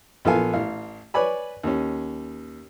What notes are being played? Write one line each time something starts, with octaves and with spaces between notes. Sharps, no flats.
A#1 B3 F4 A4 F5 G#5
A1 F5
B4 C#5 D5 G#5 B5
D#2 C#4